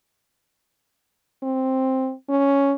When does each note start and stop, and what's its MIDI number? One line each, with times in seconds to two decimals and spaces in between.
1.43 2.12 60
2.29 2.74 61